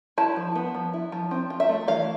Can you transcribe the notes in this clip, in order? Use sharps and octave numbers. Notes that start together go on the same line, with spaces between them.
E4 A5
F3
B3
F3
E4
F3
C4
F4
E5
A3
E3 F5